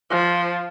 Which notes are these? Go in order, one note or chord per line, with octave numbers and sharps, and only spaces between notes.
F3